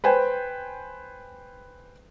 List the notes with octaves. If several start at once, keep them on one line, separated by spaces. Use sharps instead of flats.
B4 C5 G5 G#5